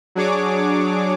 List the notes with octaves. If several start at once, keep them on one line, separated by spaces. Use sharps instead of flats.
F#3 D4 G#4 C#5 D6